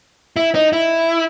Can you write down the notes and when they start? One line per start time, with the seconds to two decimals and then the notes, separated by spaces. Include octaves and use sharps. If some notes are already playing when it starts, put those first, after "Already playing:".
0.36 E4
0.55 D#4
0.73 E4